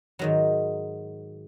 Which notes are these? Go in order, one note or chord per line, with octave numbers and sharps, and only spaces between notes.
G#2 D#3 F#3